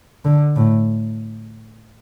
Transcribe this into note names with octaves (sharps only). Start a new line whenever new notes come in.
D3
A2